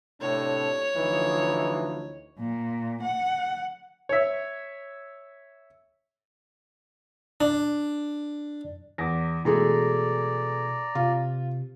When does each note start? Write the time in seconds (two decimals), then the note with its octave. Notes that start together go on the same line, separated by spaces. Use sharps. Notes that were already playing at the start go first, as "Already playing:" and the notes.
0.21 A2 C3 D4 A4 C#5
0.96 D2 E3 F3 D#4
2.39 A#2
3.03 F#5
4.09 C#5 E5
7.41 D4
8.98 E2 D6 A#6
9.45 B2 E3 G#3 A3 D5 A#5
10.95 C3 F4